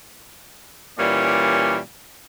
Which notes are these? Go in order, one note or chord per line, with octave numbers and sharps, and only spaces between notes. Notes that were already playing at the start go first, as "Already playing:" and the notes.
A#2 E3 G3 A#3 C#4 D5